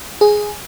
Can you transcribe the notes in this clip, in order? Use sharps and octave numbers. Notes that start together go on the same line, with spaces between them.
G#4